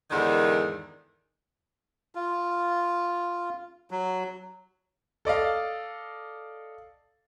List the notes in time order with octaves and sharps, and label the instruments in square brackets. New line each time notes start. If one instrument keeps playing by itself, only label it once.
[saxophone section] E2 G#2 D3 D#3
[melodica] F4
F#3
[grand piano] A4 D5 D#5 F5